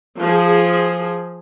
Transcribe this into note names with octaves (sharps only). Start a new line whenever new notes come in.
F3 G#4